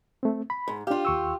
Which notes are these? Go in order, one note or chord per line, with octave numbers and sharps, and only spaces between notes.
A3 C4
B5
G#2
D4 F4 G4 F5
D#2 C#6 E6